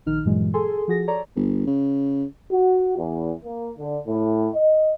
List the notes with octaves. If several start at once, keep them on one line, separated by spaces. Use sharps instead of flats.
A#1 D#3 D#4 F6
G2 A#2 E3 F#3 G#3
G#4 A4 G#5 C6
F3 F#4 G#4 A#6
A4 C#5 D5 A#5
G1
C#3
F#4
E2
A#3
D3
A2
D#5